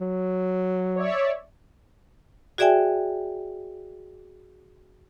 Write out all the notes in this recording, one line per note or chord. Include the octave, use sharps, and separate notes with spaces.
F#3
C#5 D5 E5
F#4 G#4 D5 E5 G5 G#5